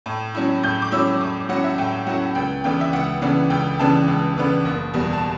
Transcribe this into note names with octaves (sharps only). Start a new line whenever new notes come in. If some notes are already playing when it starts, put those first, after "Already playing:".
A2
F#3 C#4 E4
A2 G6
D6
F#3 C#4 E4 E6
A2 D6
F#3 C#4 E4 F#5
E5
A2 G5
F#3 C#4 E4 F#5
C#2 G5
C#3 E3 B3 D4 G5
E5
C#2 F#5
C#3 E3 B3 D4
C#2 G5
C#3 E3 B3 D4 A5
C#2
C#3 E3 B3 D4
F#1
E2 B2 G3
A5